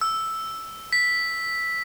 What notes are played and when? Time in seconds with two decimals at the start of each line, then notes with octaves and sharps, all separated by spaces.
0.01 E6
0.93 B6